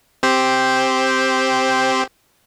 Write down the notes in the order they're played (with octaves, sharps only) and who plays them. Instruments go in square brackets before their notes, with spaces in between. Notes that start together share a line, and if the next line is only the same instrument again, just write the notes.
[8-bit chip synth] C4 G4 C5